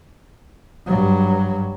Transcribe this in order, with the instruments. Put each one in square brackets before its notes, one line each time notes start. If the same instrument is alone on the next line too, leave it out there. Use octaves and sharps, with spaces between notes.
[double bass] G2 F#3